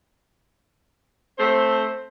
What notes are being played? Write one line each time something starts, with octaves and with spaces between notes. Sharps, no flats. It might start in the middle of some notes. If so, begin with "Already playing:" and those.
A3 C4 C5